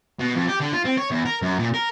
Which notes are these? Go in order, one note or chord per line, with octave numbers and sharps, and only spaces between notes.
B2
F2
G4
D3
F4
C4
C#5
E2
A#4
F#2
A#2
A#4